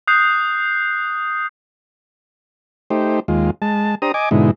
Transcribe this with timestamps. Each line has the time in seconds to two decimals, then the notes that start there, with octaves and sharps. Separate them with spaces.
0.07 D#6 F#6 G6 C7
2.90 A3 D#4 G4 C5
3.28 D#2 G#3 F4
3.62 G#3 A5
4.02 D4 G4 C5 A#5 D#6
4.14 D#5 G#5 D6
4.31 G#2 B2 D3 G#3 D#4 E4